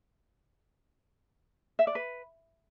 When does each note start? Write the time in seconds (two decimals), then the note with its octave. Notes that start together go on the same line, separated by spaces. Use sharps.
1.79 E5
1.87 D5
1.95 B4